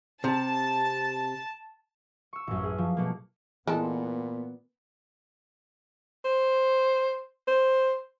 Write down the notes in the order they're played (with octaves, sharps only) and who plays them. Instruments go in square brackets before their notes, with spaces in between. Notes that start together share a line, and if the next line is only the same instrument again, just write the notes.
[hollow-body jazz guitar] C3 [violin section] A5
[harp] C#6 E6
A1 F#2
G#4
F3
B2 A3 A#3
[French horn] A#2 [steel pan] E3 [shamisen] G#3 C4 A4 [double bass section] B3
[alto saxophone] C5
C5